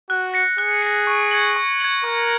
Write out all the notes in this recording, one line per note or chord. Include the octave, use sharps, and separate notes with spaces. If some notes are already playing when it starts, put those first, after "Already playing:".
F#4 F#6
A#6 C#7
G#4 F#6
A#6 C#7
C#6
G#6 C#7 F#7
C#6
G#6 C#7 F#7
A#4 C#6